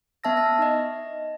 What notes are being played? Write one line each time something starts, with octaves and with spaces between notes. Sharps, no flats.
B3 E5 A5 E6 A#6
A#6
D#4 D#5